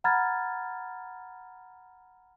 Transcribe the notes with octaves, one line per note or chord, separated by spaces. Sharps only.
F#5 A#5 B5 F6 G#6 A6